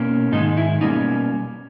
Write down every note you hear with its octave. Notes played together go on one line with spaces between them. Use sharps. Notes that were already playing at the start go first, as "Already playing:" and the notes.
Already playing: B2 A#3 C#4
G#2 D#3 G#3 D#4
E4
B2 G3 A#3 C#4 D#4